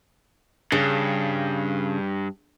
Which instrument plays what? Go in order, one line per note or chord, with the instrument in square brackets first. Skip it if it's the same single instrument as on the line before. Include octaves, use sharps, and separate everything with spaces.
[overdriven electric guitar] G2 [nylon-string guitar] C#3